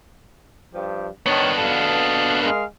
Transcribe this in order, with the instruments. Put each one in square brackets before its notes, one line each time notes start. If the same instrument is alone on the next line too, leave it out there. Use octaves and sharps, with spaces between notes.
[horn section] G2 F3 G4
[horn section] D#3 C#5 A5 [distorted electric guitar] B3 D4
[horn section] B2 A4 F5
G#3 A#4 F5